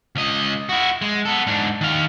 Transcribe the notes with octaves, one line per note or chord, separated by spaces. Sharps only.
C#2 D#5
E4 F#4
G#3
B3 A4
G#2 D4
D#3 F5